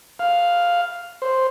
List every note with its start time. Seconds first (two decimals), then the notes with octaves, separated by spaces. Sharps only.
0.19 F5
1.22 C5